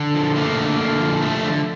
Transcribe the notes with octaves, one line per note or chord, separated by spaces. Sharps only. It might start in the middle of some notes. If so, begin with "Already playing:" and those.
Already playing: D3
F3
A3 A#3
D3
D3
F3
A3
D3